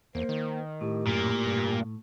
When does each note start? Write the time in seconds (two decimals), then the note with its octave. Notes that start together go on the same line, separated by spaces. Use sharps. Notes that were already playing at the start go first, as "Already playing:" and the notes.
0.15 E2 A#3 C5
0.29 D#3
0.81 A2 G4
1.07 F#2 A#2 A#3
1.46 G2